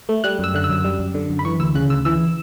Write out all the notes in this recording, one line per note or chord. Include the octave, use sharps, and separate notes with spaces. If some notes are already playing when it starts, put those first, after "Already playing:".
A3
G3 F#6
F#2 E6
D3 F#6
E6
F#2
G3
F#2
D3
F#2
B5
E3 C#6
D2 E6
C#3 F#6
D2 E6
E3 E6